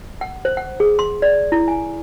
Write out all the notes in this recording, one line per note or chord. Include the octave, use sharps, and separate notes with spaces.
F#5
C5
F#5
G#4
C6
D5
E4
G#5